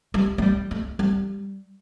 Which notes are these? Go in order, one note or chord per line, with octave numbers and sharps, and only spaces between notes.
G3
A3
G3
A3
G3